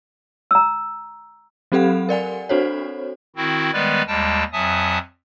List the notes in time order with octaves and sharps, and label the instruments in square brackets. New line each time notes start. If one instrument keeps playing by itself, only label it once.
[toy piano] A#5 E6
[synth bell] F#3 C4 G4 A4 F5 F#5
A#4 D5 F#5 G#5
C4 D4 F#4 A4 C5 C#5
[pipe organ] D#3 C4 E4 F#4
D#3 G3 G#3 B3 B4 D5
D#2 G3 G#3 G5 A5
F2 F#3 E5 G#5 A5 D#6